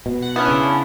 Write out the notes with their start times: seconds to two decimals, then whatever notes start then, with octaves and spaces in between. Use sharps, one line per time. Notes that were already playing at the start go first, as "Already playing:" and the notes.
0.06 B2
0.22 F#5
0.36 B3 C#4 D4 E4
0.48 C#3